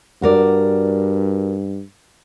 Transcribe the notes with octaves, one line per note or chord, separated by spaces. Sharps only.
G2 F#4 A#4 D5